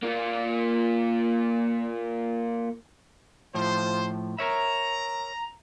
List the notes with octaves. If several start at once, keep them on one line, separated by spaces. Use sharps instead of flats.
A#3 F4
A2 F3 F4 C5
A#4 C#5 E5 A#5